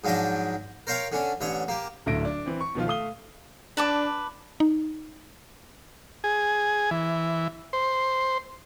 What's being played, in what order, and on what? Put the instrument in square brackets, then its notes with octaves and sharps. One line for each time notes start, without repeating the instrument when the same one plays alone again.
[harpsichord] G#2 F3 F#3 D4 D#5 G5
A#4 C5 C#5 F5 G5
D3 C#4 D4
A1 D3 C#5
A#3 G4
[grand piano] D1 D3 A3 E5 A#6 D7
D4
E3 C4
C#6
B2 D#3 F3 F4
A3 F5 D#6 G7
[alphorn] D4 [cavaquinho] B4 A5 D6
[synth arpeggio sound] D#4
[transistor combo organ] G#4
E3
C5